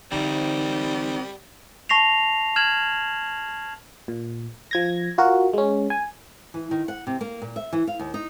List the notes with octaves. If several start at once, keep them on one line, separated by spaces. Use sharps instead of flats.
D3 E3 G3 C4 D#4 A#4
A5 C#6 A#6 C7 F7
F6 G#6 E7 F#7
A#2
F3 G#6 A#6
F4 F#4 A#4
G#3 C#4
G#5
E3
D#3
F#5
C3
A#3
A#2
E5
E3
F5
D#2
D#4